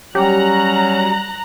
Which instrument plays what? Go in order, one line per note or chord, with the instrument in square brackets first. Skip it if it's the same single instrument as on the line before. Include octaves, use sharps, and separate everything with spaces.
[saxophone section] F#3 C#4 [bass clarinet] G3 [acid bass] G4 [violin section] A#5 F#6